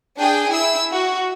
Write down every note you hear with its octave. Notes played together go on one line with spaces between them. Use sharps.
D4 G#4 G5
E4 E6
F#4